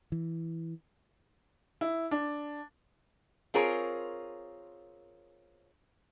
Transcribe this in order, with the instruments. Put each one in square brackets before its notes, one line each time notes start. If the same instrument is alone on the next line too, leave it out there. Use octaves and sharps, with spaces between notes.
[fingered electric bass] E3
[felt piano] E4
D4
[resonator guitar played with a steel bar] C4 F4 G#4 A#4 C#5